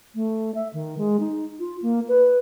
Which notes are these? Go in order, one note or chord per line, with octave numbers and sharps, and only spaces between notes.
A3
E5
D#3
G#3
D#4
F4
A#3
B4